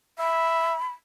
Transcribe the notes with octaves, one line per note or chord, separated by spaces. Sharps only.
E5 B5